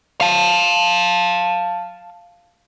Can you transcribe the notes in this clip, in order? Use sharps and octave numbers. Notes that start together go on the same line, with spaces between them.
F5 A5